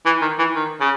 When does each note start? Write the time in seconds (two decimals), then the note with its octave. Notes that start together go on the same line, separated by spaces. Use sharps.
0.06 E3
0.22 D#3
0.39 E3
0.55 D#3
0.81 C#3